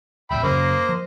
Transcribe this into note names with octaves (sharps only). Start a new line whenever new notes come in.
D#1 A1 E5 G5 B5
F#2 C#3 A#3 C5 D#5
F3